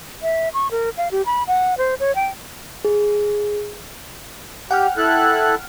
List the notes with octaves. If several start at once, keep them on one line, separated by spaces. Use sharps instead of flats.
E5
C#6
A#4
F5
G4
B5
F#5
C5
C#5
G5
G#4
G4 F#5 G5 F6
E4 A4 F#6